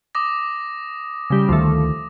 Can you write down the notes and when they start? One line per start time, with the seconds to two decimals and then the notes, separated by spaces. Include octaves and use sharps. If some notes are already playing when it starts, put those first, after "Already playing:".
0.15 D6 D#6 A#6
1.30 C#3 G3
1.49 D2 D#3 F3 A3